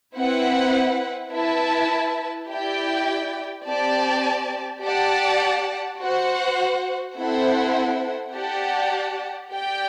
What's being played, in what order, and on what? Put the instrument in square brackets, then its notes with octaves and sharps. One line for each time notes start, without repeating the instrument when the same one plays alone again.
[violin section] C4 E4 B4 F#5
E4 B4 E5 A5
E4 G4 D5 G5
C4 G4 D5 A5
G4 D5 F#5 A5
F#4 C5 F#5
C4 E4 A4 C5 F#5
G4 D5 F#5 A5
G4 D5 G5